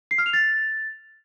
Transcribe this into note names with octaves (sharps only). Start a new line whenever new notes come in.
C7
F6
F7
A6